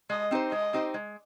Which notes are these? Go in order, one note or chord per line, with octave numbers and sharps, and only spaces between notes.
G#3 D#5
C4 D#4 G4 C5
G#3 D#5
C4 D#4 G4 C5
G#3